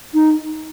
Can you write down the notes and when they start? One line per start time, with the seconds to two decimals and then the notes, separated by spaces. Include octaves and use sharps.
0.14 D#4